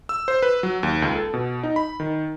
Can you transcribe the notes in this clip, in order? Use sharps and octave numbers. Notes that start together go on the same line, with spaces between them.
E6
C5
B4
F#3
D#2
C#2
A4
B2
D#4
B5
D#3